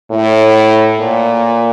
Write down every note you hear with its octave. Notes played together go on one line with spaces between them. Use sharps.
A2
A#2